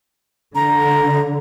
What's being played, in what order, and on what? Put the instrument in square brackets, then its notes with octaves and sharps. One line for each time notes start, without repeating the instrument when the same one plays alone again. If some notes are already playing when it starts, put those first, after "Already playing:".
[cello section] D3 [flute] A#5